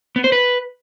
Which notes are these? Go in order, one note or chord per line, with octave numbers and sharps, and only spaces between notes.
B3
C5
B4